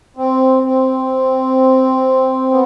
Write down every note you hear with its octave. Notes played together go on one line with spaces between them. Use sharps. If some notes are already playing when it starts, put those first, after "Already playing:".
C4
C4
B3